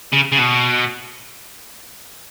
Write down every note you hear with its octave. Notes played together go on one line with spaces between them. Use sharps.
C#3
C#3
B2